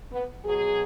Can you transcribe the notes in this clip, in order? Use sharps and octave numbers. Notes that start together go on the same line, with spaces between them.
B3
B2 F#3 G#4